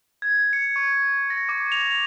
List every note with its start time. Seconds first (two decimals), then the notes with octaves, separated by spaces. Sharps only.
0.22 G#6
0.53 C#7
0.76 C#6
1.30 A#6
1.49 D6
1.72 F7